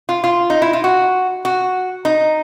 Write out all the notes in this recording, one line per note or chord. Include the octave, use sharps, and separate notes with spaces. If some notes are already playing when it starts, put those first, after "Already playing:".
F4
F4
D#4
E4
F4
F#4
F#4
D#4